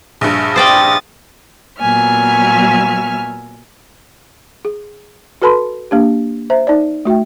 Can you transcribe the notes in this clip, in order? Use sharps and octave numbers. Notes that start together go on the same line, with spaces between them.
A#1 G2
C5 D5 G5 D#6 A6
A#2 F#3 B3 E5 G#5 F6
G#4
F#4 A4 B4 A5 B5 C6
A#3 D4 G4
C5 E5 A#5
D#4 D5
A3 F#4 E5 G5